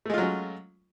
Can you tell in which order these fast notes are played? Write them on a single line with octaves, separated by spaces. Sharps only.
A3 G#3 F4 F#3 C#4